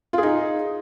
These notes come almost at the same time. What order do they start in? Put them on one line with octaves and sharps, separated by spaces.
F4 G#4 D#4